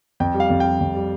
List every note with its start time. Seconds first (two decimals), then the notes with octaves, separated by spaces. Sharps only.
0.20 F2 G5
0.34 G3
0.40 F5
0.50 F2
0.60 G3 G5
0.81 F2
0.95 G3